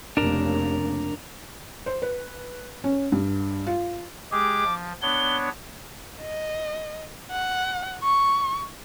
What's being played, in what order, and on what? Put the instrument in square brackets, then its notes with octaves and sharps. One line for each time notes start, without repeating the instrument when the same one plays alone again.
[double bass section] F1 C#3 A#3 [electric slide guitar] D4 A#4
[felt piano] C5
B4
C#4
G2
F4
[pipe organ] G#3 G4 G#4 [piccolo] D6
[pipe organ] F3
[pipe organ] B3 D4 C#5 [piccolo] G7
[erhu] D#5
F#5
C#6